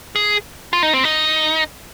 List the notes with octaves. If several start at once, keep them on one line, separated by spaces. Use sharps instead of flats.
G#4
F4
D#4
C4
D#4